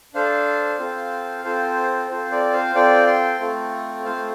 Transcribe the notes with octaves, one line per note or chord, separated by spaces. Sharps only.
D4 A4 C5 F5
C4 F4 A4
C4 F4 A4 C5
C4 F4 A4 C5
A4 D5
C5 F5
C4 F4 A4 D5 G5
G5 C6
A3 C4 F4 A4
A3 C4 F4 A4 C5 F5